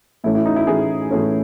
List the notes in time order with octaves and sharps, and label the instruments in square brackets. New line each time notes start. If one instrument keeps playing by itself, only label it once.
[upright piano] A2 E3 A3 C#4 E4
E4
D#4
E4
A2 E3 A3 C#4 G#4
A2 E3 A3 C#4